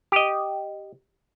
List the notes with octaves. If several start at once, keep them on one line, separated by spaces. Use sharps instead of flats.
G4 D#5